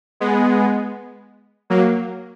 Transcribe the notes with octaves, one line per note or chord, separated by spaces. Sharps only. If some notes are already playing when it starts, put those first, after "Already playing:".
G#3 B3
F#3 A#3